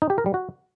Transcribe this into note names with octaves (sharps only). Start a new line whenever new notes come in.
D#4
G4
A#4
G3
F#4